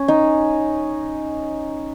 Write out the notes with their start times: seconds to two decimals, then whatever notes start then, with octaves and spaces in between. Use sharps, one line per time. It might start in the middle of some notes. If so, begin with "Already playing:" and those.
Already playing: C#4
0.08 D#4